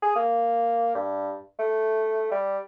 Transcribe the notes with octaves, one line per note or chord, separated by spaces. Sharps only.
G#4
A#3
G2
A3
G3